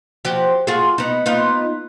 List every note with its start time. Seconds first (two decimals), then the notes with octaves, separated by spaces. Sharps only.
0.25 F3 F#4 G4
0.67 F4 F#4 G#4
0.98 B3 D#4
1.26 B3 D#4 F4